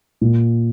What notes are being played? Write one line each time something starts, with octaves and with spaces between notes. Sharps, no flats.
A#2